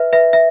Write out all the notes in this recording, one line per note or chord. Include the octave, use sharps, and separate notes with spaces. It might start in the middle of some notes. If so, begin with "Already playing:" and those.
Already playing: B4 E5
B4 E5
E5